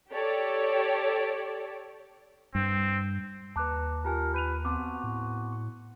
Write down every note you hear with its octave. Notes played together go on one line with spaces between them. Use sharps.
G4 A4 C#5 D5
G2 C4
D#2 B4 A5 A#5 D6 F#6
F4 G4 A#4 G#5 A5
B4 G6 D#7 F7
B3 C4 F#4 A5 C6 D6
A2
C#6